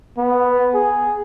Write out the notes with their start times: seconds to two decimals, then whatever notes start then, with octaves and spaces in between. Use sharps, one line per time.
0.18 B3
0.74 G#4